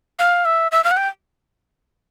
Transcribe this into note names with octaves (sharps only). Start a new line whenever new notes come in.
F5
E5
E5
F5
F#5
G5